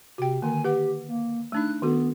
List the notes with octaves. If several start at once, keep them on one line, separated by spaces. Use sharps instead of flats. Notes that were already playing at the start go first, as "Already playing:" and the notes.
C3 F#4 G5
D3 D#3 A#3 G#5
G4 B4 F#5
A#3
A3 D4 D#4 F#6
D#3 B3 F#4 A4